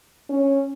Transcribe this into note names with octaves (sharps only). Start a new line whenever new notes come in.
C#4